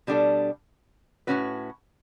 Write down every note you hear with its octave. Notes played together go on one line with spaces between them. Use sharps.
B2 G3 D4 A4
A2 F#3 C#4 F#4 B4